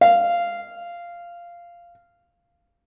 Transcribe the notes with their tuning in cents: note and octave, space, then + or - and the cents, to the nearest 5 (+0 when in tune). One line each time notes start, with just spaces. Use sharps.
F5 -10